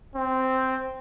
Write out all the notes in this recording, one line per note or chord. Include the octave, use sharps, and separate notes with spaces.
C4